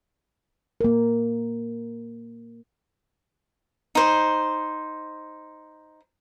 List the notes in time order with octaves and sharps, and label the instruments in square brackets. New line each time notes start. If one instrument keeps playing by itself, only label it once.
[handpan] A#3 A#4
[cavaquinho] D#4 C5